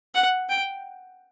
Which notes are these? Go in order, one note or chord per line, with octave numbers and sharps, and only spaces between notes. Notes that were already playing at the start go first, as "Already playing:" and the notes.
F#5
G5